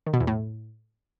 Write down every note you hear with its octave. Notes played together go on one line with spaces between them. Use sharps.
D#3
B2
E2
A2